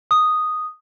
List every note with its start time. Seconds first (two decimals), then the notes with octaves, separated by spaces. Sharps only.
0.11 D#6